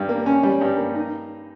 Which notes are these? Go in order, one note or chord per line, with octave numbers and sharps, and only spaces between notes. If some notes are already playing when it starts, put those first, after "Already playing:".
Already playing: G2 G3
A#3
C#4
G3
G2
A#3
D#4